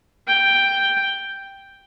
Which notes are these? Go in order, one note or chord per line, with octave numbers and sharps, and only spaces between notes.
G5